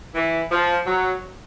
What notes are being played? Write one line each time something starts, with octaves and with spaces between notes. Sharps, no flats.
E3
F3
F#3